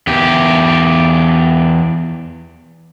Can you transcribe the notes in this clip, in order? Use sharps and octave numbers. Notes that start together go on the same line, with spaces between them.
E2 G4